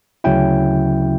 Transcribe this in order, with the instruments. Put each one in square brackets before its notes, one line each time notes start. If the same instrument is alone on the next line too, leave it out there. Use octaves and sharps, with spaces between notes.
[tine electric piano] D2 C#3 F#3 C#4 E4 G5